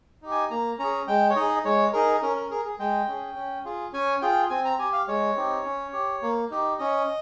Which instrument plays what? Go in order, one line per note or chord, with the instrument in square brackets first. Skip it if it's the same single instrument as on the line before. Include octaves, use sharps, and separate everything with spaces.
[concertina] D#4 G4
G#5
A#3 A#5
C#4 G#4 A#5
G#3 G5
C#5
D#4 G#4 D#5
G#3 C#5
D#4 G#4 A#4
C#4 A#4
A#4
G#4 A#4
G#4
G#3 G5
C#4 G#4
C#4
F4 G#4
C#4 G#5
F4 G#4 G5
C4 G#5
A#5
G4 G#5
F5
G#3 C#5
C4 D#4 G4
C#4
G4
A#3
D#4 G4
C#4 D#5